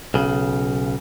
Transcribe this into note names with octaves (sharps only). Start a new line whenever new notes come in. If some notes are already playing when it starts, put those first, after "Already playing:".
B1 C#3